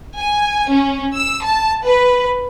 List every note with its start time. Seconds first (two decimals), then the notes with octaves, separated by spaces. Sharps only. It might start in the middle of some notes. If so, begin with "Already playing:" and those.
0.18 G#5
0.71 C#4
1.14 E6
1.44 A5
1.84 B4